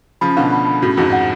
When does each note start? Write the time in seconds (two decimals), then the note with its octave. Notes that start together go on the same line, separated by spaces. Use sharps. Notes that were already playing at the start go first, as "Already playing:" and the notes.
0.21 C#3 F3 B5
0.37 B2 D3 F5
0.52 B5
0.67 B5
0.82 A2 C#3 F#4
0.97 F2 G#2 F#4
1.13 F#5